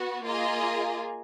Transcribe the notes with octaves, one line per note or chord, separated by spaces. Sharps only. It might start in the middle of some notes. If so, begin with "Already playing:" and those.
Already playing: B3 F#4
A#3 F4 G#4 D#5